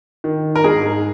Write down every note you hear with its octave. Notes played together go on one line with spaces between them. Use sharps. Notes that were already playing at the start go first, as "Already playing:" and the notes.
D#3
A#4
G#2 G#4